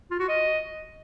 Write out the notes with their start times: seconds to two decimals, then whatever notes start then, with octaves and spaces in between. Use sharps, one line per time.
0.11 F4
0.20 F#4
0.29 D#5